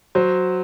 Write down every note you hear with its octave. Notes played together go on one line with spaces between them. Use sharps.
F#3 C5